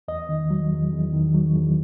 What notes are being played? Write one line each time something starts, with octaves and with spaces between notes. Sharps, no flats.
E2 D#5
D#3
F#3
E2
E2
D#3
F#3
E2